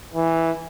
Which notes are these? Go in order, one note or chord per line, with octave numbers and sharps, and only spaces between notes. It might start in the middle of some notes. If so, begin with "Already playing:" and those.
E3